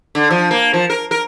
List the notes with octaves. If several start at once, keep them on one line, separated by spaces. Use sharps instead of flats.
D3
F3
A#3
F3
A#4
A#4